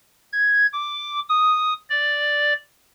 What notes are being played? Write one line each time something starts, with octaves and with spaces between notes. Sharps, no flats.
G#6
D6
D#6
D5